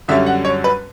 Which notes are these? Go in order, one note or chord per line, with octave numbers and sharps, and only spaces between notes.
F#2 D3 G3 C#4 E5
F#5
C#5
B4